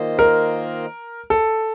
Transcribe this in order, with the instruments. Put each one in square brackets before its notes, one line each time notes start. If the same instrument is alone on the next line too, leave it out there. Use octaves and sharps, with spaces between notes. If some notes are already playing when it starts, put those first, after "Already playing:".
Already playing: [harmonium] D#3 A#3 F4 C5 D#5
[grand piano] A#4
A4